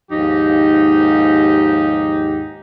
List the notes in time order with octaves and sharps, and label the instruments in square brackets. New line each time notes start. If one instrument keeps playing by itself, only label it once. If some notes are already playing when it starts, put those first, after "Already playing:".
[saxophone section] D#2 G#2 F3 D#4 G4